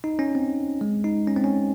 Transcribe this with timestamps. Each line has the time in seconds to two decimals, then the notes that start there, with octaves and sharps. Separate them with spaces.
0.04 D#4
0.19 C#4
0.35 C4
0.81 G#3
1.04 D#4
1.28 C#4
1.36 C4
1.44 C#4